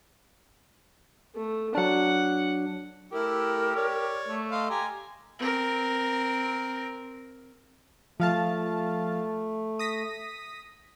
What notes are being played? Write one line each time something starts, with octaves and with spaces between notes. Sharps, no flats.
A3
F#3 D4 F#5
A3 E4 G4 A#4
C#5 D5
A3
A4 D#5 F5 C6
G4 G#5 A#5
C4 A#4
F3 A3 F5 A5
D#6 A#6 B6